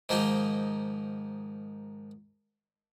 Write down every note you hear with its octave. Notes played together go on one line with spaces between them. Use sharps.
G#2 D#3 F3 A#3 D#4 F4